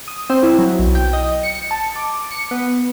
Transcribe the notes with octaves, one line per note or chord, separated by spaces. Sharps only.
D#6
C4
E4
F#3
B1
G5
D#5
C#7
A5
D6
C#7
B3